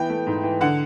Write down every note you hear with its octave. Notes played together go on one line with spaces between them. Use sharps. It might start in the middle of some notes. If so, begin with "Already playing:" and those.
Already playing: E3 B3 G5
A3
G#2
E3
D3 F#5